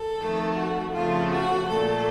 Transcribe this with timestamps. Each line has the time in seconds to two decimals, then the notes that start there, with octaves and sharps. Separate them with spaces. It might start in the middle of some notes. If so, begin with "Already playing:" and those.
Already playing: A4
0.17 F2 D#3 A3
0.55 F#4
0.93 F2 C#3 F3 A3 F4
1.31 F#4
1.69 A#2 A3 A4